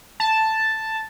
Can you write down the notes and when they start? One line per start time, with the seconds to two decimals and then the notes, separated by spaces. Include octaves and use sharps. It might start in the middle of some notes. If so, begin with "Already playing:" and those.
0.20 A5